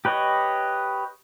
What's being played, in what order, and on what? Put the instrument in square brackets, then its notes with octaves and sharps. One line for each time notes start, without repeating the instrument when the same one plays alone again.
[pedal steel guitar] G4 B4 C#5 D#5